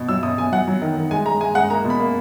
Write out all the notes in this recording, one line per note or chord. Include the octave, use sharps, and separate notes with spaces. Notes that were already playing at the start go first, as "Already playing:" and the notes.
Already playing: B2
F#3 E6
B2 D#6
B2 G#5
F#3 F#5
F#3
D#3
D#3
G#3 G#5
G#3 A#5
G#3 G#5
G#3 F#5
A#3 A#5
B2
B5
A#3